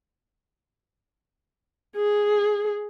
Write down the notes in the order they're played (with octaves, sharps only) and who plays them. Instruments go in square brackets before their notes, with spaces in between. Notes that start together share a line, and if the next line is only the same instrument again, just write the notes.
[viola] G#4